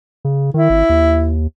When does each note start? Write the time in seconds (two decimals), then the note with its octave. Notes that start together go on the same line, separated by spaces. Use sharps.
0.25 C#3
0.54 D#3 E4
0.70 G#1
0.89 D#2